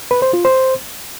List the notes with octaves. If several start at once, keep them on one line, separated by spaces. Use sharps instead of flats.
B4
C5
F4
C5